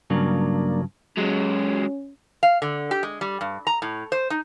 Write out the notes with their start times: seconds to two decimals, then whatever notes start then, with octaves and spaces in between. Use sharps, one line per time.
0.10 G2 C#3 F#3 A#3 D4
1.18 F#3 G#3 C#4
2.43 F5
2.62 D3
2.91 G4
3.03 G#3
3.21 G3
3.41 G2
3.67 A#5
3.82 A2
4.12 C5
4.30 D#4